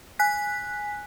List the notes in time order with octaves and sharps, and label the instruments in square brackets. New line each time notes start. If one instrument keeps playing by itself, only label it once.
[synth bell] G#5 F#6 B6